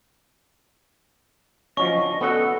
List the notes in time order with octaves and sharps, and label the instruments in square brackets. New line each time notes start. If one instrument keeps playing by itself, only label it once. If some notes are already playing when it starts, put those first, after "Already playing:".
[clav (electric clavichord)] F3 F#3 C#4 [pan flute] D#5 [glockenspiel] C#6
[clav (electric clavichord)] D4
[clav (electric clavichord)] B3 C#4 F#4 [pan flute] A4